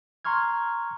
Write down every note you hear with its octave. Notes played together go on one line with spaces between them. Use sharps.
A#5 C6 C#6 F6 G#6